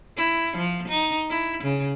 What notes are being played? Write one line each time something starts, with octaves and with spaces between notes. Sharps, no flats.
E4
F3
D#4
E4
C#3